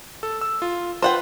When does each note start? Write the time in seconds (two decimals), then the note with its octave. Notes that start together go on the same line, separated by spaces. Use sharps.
0.23 A4
0.41 E6
0.62 F4
1.02 F4 B4 C5 F#5 G5